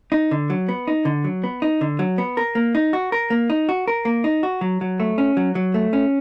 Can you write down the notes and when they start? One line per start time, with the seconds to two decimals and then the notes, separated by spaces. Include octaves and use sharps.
0.12 D#4
0.31 D3
0.50 F#3
0.69 B3
0.87 D#4
1.05 D3
1.24 F#3
1.44 B3
1.62 D#4
1.81 D3
1.99 F#3
2.18 B3
2.37 A#4
2.55 A#3
2.75 D#4
2.93 F#4
3.12 A#4
3.30 A#3
3.50 D#4
3.69 F#4
3.88 A#4
4.05 A#3
4.24 D#4
4.43 F#4
4.61 F#3
4.81 F#3
5.00 A3
5.18 C#4
5.37 F#3
5.55 F#3
5.74 A3
5.93 C#4